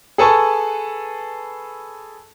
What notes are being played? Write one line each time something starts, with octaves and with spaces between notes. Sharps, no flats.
G#4 A4 B4 A5 C#6